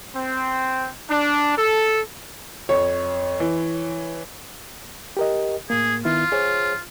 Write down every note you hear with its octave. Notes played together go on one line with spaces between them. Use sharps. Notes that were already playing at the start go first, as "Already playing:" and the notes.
C4
D4
A4
F2 C#5
E3
G4 A#4 D#5
A2 A#3 G#4
D#3 B3 E4 F4
G#4 C5 C#5